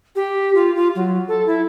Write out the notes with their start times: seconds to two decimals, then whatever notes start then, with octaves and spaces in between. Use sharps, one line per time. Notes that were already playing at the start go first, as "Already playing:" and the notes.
0.16 G4
0.55 F4
0.76 F4
0.95 F#3
1.28 A4
1.47 E4